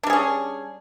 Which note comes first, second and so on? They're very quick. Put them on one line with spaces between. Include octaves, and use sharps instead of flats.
D4 G3 G#4 C#4